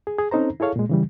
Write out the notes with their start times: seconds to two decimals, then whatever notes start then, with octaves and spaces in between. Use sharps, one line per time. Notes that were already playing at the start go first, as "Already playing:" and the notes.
0.07 G#4
0.19 G#4
0.31 C4 C#4 D#4 A4 C5 A#5
0.60 E4 G#4 A4 C#5 F5
0.76 A#2 G#3
0.89 C#3 E3 G3